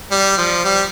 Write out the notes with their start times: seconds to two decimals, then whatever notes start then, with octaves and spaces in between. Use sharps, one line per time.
0.11 G3
0.38 F3
0.65 G3